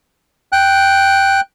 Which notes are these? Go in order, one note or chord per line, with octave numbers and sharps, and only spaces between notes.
G5 F#6